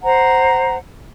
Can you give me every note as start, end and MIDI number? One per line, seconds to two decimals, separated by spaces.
0.03 0.77 72
0.03 0.77 78
0.03 0.77 82